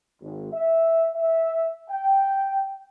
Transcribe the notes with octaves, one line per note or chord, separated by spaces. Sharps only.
G#1
E5
E5
G5